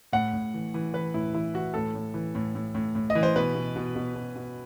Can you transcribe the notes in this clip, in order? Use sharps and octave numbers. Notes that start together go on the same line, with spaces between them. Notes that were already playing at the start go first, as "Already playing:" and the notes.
A2 F#5
A2
E3
E3
E3 B4
A2 E4
E3 E4
E3 F#4
A2 A4
A2
E3
A2
A2
A2
A2
D#5
E3
C5
B2 B4
B2
B2
B2
B2
B2